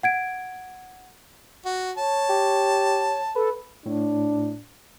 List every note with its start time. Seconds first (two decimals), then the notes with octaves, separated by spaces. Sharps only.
0.03 F#5 G#6 D7
1.65 F#4
1.97 C#5 A5
2.30 G4
3.36 A4 B4
3.86 A2 D4